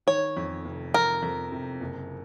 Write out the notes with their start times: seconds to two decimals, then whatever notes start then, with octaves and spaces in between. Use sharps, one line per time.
0.07 D#3 C#5
0.37 F2
0.65 F1
0.94 F2 A#4
1.22 F2
1.52 C3
1.80 F#1